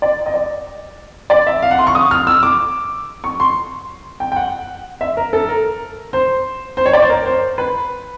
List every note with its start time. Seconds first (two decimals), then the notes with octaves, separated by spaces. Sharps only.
0.02 D5
0.26 D#5
0.34 D5
1.30 D5
1.47 E5
1.62 F5
1.71 F#5
1.79 C6
1.87 C#6
1.95 D#6
2.11 F6
2.27 E6
2.43 D6
3.24 C#6
3.40 C6
4.20 G5
4.32 G5
4.36 F#5
5.01 E5
5.17 A#4
5.33 A4
5.49 A#4
6.13 C5
6.77 C5
6.86 C#5
6.93 D5
7.01 C5
7.10 A#4
7.26 C5
7.58 B4